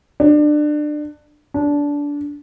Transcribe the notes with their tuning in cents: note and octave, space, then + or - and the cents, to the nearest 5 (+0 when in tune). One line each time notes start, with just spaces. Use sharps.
D4 +25
D4 -20